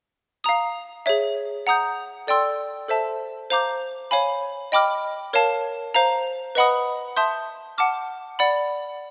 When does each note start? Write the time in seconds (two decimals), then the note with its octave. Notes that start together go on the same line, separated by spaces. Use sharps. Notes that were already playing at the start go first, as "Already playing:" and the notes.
0.44 F5 A#5 D#6
1.06 G#4 C#5 E5
1.67 F#5 A#5 D#6 G6
2.27 A4 D5 G5 C6 E6
2.88 A4 C5 E5 A5
3.50 C5 F5 A#5 D6 G6
4.11 C#5 F5 G#5 B5
4.72 D#5 G5 B5 D6 F6
5.33 A#4 C#5 F5 A5
5.94 C5 F5 A#5
6.55 B4 D#5 F#5 B5 D#6
7.16 E5 A5 C6 D#6 G6
7.78 F#5 A5 D6 F6
8.39 D5 F#5 B5